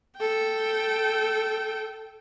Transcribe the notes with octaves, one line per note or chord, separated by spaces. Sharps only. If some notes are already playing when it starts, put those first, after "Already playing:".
A4 G5